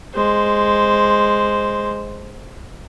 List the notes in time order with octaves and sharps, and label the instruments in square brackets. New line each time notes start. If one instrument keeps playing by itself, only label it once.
[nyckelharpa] G#3 C5